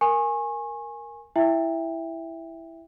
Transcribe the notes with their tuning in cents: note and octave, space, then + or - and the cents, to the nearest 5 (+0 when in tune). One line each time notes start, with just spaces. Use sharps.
A#4 +0 G#5 +0 C#6 -35
E4 +0 E5 +0 G5 +20